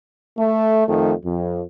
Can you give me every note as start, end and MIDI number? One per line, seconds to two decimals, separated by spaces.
0.38 0.84 57
0.88 1.13 41
0.88 1.13 51
0.88 1.13 57
1.24 1.62 41